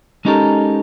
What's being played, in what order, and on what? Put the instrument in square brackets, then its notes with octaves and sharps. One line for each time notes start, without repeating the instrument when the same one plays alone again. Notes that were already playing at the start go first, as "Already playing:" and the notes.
[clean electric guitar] G#3 C#4 D#4 G4 A4 A#4